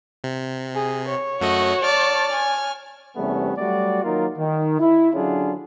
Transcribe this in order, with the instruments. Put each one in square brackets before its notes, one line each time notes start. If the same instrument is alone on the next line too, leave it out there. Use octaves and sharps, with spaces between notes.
[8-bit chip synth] C3
[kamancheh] G#4
C#5
[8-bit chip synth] F#2 A3 D#5 [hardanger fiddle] F#4
[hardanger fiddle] D5 A5 [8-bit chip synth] F6
[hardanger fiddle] G#5
[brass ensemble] E2 C3 G3 A3 B3 C#4
F#3 G3 A3 F#4 D5
D#3 F#3 A#3 D#4 F4 A#4
D#3
E4
D3 F#3 C#4 D4 F4 G#4